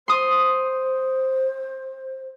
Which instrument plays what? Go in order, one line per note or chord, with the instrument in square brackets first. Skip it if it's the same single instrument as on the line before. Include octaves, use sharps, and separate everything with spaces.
[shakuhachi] C5 [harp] C6 D#6